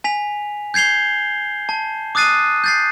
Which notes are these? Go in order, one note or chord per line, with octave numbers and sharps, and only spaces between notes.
G#5 B6 F7
G6 G#6 C7 F7 G7
A5
D6 D#6 F#6 A6 C7 D#7
G6 A6 C7